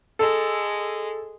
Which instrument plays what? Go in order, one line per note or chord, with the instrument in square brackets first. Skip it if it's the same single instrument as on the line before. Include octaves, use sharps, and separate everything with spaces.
[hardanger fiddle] G#3 [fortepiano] A4